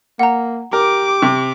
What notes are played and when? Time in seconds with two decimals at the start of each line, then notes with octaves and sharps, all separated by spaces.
0.19 A#3 F#5 A#5
0.73 G4 A#4 D6
1.22 C3